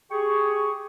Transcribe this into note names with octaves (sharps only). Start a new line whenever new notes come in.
G4 G#4 C#6